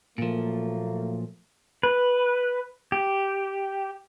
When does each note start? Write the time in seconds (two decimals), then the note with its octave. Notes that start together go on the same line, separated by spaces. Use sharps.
0.18 A#2 F3 F#3 A3 A#3
1.83 B4
2.92 G4